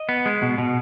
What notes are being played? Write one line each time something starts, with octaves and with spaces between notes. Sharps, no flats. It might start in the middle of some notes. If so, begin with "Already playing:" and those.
Already playing: D#5
B3
G#3
B2
B2